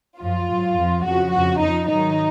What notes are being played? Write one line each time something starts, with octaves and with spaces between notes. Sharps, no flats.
F#2 F3 F4
G#2 F#3
F2 F3
F2 C#3 F3 F#4
F2 C#3 F3 F#4
F2 F3 D#4
G#2 D#3 F#3 D#4